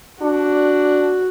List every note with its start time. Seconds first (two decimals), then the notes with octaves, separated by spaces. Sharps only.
0.22 D4 F#4